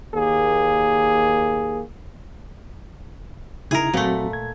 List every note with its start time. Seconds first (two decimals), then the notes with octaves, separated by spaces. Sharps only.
0.15 D#2 A#3 G#4
3.71 C#3 D#4 E4 G#4 A#4
3.94 A#2 F#3 A3 C4 F#4
4.33 G#6